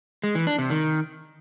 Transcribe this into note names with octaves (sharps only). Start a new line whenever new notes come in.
G#3
E3
D4
C3
D#3